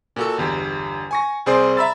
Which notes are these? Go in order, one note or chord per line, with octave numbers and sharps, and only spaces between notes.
A#2 F#4 A4
G1 E2 G4
G#5 C#6 A#6
C2 C4 G#4 C5 D5 C6
E5 A#5 B5 E6 A6